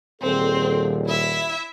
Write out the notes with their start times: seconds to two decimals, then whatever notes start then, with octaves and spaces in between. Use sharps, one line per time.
0.22 D#1 C4 G#4 A4
1.06 E4 E5